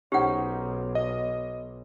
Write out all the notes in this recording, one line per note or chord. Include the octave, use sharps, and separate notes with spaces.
B1 C#4 D#4 G4 C5 F#5
D#5